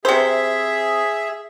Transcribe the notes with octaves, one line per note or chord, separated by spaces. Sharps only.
C3 G#4 C5 E5